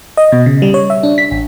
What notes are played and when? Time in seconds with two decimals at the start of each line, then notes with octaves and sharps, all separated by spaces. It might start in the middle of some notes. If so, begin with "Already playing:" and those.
0.17 D#5
0.32 B2
0.46 C#3
0.62 G3
0.74 C#5
0.90 E5
1.03 D4
1.18 B6
1.31 A1